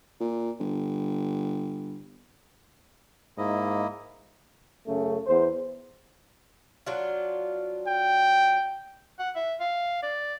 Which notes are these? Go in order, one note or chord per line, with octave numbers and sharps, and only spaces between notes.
A#2
G1
G#2 A#3 E4 D#5
F#2 C#3 A3
E2 C5
F#3 D4 F4
G5
F#5
E5
F5
D5